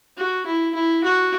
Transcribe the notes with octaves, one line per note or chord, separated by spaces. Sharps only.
F#4
E4
E4
F#4